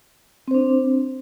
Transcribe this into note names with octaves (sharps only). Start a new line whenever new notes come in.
C4 D4 C5